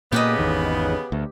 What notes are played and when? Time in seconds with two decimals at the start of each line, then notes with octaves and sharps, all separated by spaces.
0.12 A#2 C#3 A#3 B3 G4 B4 D#5
0.39 G#1 E2 D#3
1.12 D2